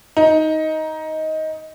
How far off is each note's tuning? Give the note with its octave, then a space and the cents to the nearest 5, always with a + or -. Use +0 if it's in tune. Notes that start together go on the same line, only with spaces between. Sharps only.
D#4 +15